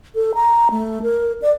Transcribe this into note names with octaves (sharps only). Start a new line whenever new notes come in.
A4
A#5
A3
A#4
D5